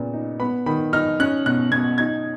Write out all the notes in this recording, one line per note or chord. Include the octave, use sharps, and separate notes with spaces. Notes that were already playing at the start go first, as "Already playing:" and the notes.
Already playing: A#2 C#3 B3
D#4
B3 B5
D#3 B5
D#4 F6
C#4 F#6
B2 F#6
B2 G#6
D#4 G#6